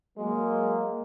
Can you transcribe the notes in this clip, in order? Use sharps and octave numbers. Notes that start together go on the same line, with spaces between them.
F#3 G#3 A#3